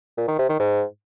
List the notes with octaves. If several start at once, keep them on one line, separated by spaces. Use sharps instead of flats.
A#2
D#3
C3
D#3
G#2